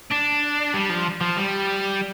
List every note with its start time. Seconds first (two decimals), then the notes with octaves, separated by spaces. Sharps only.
0.12 D4
0.74 G3
0.90 F3
1.21 F3
1.37 G3